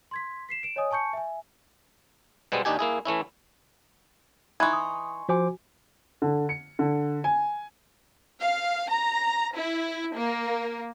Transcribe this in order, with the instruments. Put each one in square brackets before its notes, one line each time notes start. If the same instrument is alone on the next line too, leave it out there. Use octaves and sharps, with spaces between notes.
[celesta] C6 G#6 B6
B6 C7 E7
D7 E7
C#5 D#5 G#5 D#6
G#5 A5 C#6 G6 C#7
E5 G#5
[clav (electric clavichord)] B2 G3 G#3 B3 C4
D#2 D4 D#4 G4 G#5
A#3 E4 G#4
E3 A3 C#4 E4
[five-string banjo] E3 D#4 [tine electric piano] G#5 C6 C#6 [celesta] F#6 G#6
[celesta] D#6
[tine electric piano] F3 C5 D6 [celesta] F#4 G#5
[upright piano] D3
C#7
D3
G#5
[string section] F5
A#5
E4
A#3